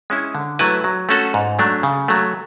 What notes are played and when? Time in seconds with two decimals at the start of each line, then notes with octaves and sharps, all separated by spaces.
0.10 G#3 C#4 E4
0.35 D3
0.59 F#3 A3 E4 B4
0.84 F#3
1.09 A3 C#4 F#4 A4
1.34 G#2
1.59 F#3 A3 D4
1.83 C#3
2.08 F#3 A3